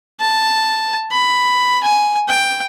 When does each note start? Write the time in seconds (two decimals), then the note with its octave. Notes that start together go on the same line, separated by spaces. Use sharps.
0.20 A5
1.11 B5
1.83 G#5
2.29 G5